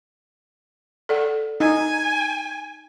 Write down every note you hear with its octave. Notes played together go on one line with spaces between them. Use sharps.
A4 D5 F#5
D#4 G#5